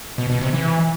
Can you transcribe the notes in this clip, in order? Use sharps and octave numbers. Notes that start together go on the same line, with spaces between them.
B2
B2
C3
E3